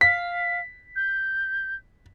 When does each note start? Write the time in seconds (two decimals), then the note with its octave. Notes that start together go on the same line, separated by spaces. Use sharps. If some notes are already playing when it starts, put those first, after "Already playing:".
0.01 F5 B6
0.96 G6